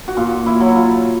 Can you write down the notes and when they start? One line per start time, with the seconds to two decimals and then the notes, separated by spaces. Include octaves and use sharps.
0.08 F#4
0.17 A#2 F4
0.46 E4
0.60 F#3
0.75 F4